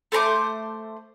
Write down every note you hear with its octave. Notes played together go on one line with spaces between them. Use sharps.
A3 C5 A#5 D6